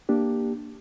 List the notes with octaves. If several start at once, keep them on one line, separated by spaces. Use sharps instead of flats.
A#3 D4 G4